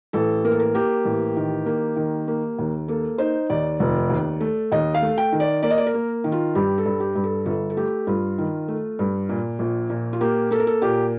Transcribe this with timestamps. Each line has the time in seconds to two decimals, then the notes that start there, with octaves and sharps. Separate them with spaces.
0.13 A1 A4
0.44 A#3 A#4
0.52 A4
0.60 A#4
0.75 A#3 G4
1.05 A1
1.36 D#3
1.66 A#3
1.96 D#3
2.28 A#3
2.59 D#2
2.88 A#3 A4
3.18 D#4 C5
3.50 D#2 D5
3.80 F1
4.10 D#2
4.40 A3
4.72 D#2 D#5
4.94 F5
5.02 A3
5.18 G5
5.32 D#3
5.40 D5
5.63 A#3 D5
5.71 D#5
5.78 D5
5.87 A#4
5.94 A#3
6.24 D#3
6.32 F4
6.55 G2 G4
6.78 A4
6.86 G2
7.00 G4
7.16 G2
7.24 A4
7.46 G1 A4
7.70 A4
7.77 A3 G4
8.07 G2 F4
8.38 D#3
8.68 A3
8.99 G2
9.29 A#2
9.59 A#1
9.90 A#2
10.13 F4
10.21 A#3 G4
10.51 A#3 A4
10.60 A#4
10.67 A4
10.82 A#2 G4